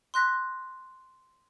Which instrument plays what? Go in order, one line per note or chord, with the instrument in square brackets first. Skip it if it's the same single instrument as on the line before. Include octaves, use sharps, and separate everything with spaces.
[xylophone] C6 F#6 A#6 B6